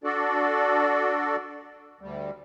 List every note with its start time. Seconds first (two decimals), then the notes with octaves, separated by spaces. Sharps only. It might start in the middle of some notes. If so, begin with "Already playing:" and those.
0.04 D4 F#4 A4 D5
2.01 D2 G3